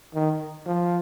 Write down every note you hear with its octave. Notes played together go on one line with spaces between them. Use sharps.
D#3
F3